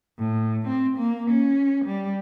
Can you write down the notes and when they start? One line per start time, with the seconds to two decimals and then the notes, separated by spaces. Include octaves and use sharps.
0.18 A2
0.67 C4
0.98 A#3
1.30 C#4
1.85 G3